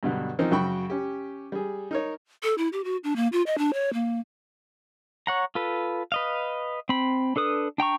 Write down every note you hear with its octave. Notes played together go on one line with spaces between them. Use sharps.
G2 B2 D3 F#3
F3 C4 C#4 D#4 A#4
F#2 C#3 F#3 G5 B5 C#6
C#4 G4
G3 G#4
D#4 A#4 C#5
A4
E4
G4
F#4
D4
A#3
F4
D#5
D4
C#5
A#3
C#5 F#5 A#5
F4 A4 B4
B4 D#5 F5
C4 B5
D4 A4 B4 D#6
D4 G5 A#5 C#6